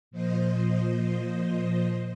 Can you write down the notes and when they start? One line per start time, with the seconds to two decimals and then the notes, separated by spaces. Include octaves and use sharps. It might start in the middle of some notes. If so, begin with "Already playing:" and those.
0.11 A#2 F3 C5 D#5